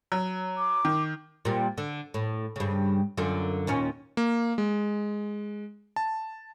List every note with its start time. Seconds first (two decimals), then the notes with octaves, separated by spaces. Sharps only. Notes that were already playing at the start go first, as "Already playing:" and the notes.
0.12 F#3
0.58 D6
0.85 D#3
1.45 A#2 G3
1.78 D3
2.14 A2
2.56 G2 C#3
3.17 F#2 D3 F4
3.67 D#2 A#2 C#4
4.17 A#3
4.58 G#3
5.96 A5